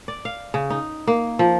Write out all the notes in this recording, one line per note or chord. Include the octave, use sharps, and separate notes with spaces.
D5
F5
C#3
D#4
A#3
F3